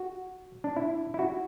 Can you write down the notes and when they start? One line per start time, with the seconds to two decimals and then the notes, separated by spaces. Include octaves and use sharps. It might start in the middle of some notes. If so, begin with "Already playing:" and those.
Already playing: F#4
0.64 D4
0.77 E4
1.14 E4
1.19 F#4